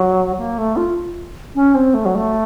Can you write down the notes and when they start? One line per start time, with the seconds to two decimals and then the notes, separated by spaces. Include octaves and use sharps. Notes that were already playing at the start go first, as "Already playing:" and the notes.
Already playing: F#3
0.38 A#3
0.58 A3
0.76 F4
1.55 C#4
1.75 C4
1.94 A3
2.05 F#3
2.15 A3